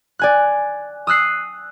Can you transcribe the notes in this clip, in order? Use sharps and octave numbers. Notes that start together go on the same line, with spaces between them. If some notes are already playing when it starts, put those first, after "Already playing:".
D5 G#5 F#6
D#6 E6 F#6 C7